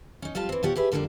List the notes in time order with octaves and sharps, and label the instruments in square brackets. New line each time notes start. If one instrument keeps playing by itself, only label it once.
[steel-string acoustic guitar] C#4 D#4
F2 G3 F4 F5 A5
E3 C4
B2 F3 G4 C#5 F#5
G4 G#4 B4 E5
F2 D3 G3 A#3 D4